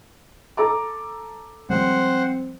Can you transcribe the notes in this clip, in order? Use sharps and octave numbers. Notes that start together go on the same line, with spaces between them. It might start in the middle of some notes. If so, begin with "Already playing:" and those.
A4 A#5 D6
F3 G3 G#3 C4 C5 F#5